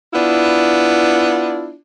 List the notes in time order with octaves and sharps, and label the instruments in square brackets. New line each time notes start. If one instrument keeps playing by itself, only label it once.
[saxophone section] B3 D4 E4 F4